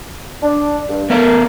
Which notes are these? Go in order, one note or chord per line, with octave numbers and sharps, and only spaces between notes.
D4
G2
A#3 B3 A#4 E5